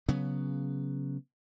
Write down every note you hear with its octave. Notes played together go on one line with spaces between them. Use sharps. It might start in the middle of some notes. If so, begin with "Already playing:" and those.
C#3 F#3 B3